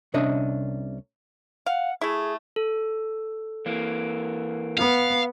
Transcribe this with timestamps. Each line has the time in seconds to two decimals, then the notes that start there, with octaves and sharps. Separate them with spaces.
0.14 C2 C3 C#4 D4 D#5 E5
1.66 F5 F#5
2.01 A3 E4 G#4
2.56 A4
3.66 E3 A#3
4.78 B3 F5